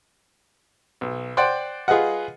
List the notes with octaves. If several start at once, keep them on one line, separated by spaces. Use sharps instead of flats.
B1
C5 D5 F#5 G5 C6
F4 G#4 B4 D#5 F#5